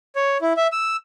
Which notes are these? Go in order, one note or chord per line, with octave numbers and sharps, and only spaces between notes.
C#5
E4
E5
E6